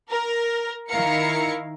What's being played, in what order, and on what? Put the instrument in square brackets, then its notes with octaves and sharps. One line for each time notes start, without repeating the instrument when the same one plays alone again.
[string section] A#4
D#3 E4 A#4 F5 C#7